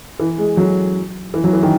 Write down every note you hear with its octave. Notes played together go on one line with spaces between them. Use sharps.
E3
G#3
F#3
E3
F#3
E3
D#3